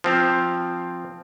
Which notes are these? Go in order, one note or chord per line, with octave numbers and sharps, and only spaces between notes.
F3 C4 F5